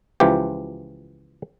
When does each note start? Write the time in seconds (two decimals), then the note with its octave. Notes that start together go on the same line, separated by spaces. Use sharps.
0.20 C#2 E3 F3 G4